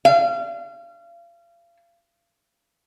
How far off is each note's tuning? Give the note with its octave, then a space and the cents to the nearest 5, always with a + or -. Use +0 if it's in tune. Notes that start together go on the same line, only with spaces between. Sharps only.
F5 -35